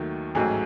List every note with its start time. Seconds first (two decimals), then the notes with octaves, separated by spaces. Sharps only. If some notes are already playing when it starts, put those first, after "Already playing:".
Already playing: D#2 D#3 F#3 A3
0.35 A1 G#2 F#3 A3 G#4